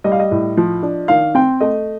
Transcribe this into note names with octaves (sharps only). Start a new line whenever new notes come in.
G3 D#5
F5
D#5
A2
F3
D4
D#3 F5
C4 G5
A3 D#5